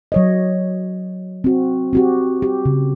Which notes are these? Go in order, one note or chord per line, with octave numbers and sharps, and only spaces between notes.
F#3 C#5 D#5
C4 F#4
C4 F#4 G4
G4
C#3